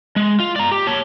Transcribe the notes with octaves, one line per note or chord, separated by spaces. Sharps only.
G#3
F4
D5 A#5
G4
C#5 A5